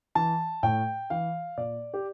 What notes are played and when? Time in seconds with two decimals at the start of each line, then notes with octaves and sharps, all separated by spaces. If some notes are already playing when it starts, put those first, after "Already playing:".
0.15 E3 A5
0.63 A2 G5
1.10 E3 F5
1.57 A#2 D5
1.94 G4